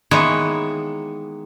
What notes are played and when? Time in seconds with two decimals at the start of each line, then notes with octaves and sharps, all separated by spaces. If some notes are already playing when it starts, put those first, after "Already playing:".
0.11 D#3 E3 G#3 A#3 B3 C#5